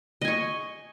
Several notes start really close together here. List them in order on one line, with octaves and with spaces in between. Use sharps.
D#5 G#5 C#6